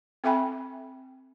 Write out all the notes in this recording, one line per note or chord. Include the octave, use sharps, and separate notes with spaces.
C4 A4 E5 G5 G#5 B5